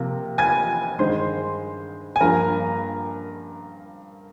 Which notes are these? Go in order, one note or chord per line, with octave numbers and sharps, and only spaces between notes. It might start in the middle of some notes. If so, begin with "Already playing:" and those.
Already playing: C3 F3 A#3
G#5 G#6
G2 D#3 G#3 C5 C6
G#5
G2 F3 A#3 A#4 A#5